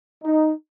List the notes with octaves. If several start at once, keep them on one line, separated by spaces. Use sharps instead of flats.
D#4